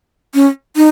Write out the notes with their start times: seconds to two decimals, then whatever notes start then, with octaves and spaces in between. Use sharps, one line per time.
0.34 C#4
0.76 D#4